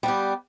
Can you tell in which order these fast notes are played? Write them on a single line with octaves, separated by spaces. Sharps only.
G3 B3 G4